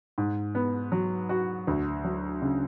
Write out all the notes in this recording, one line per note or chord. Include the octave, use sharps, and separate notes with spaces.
G#2
B3
F#3
F#4
D2
F#3
C#3